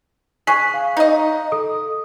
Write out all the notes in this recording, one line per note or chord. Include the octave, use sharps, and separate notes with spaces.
G#4 C#6 F#6 B6
F5
D#4 D#5
A4 D#6